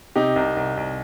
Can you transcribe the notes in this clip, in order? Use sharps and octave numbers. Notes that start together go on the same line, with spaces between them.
C3 D#4 G4
C2
C2
C2